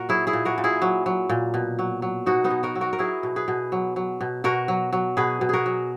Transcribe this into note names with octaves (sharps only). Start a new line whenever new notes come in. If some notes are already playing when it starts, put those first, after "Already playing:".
Already playing: A#2 F#4 A#4
F#3 E4 G#4
E4 G#4
A#2
F#4 A#4
A#2
E4 G#4
F#3
F#3
A#2
B2
F#3
F#3
B2 D#4 F#4
B3 D#4
B2
F#4 A#4
F#3
F#4 A#4
A#4
F#3 E4 G#4
B2
G#4 B4
B2
F#3
F#3
B2
B2 F#4 A#4
F#3
F#3
B2 G#4 B4
B2
F#4 G#4 A#4
F#3